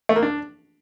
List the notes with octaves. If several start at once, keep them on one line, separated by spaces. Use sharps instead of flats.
A3
A#3
D4